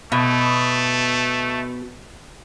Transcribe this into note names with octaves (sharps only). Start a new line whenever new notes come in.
B2 A3